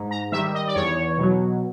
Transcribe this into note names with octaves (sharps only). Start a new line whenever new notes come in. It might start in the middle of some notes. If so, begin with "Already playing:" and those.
Already playing: G#2
A#5
D#3 G3 E5
D#5
D5
E2 C#5
B2 F#3